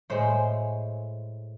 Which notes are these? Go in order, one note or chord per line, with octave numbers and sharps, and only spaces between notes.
A2 G#3 C5